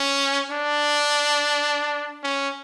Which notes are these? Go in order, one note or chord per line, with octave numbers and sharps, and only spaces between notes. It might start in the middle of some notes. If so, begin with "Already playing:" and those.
Already playing: C#4
D4
C#4